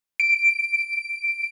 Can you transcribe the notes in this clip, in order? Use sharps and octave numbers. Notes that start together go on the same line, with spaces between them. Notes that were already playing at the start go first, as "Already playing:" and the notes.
D7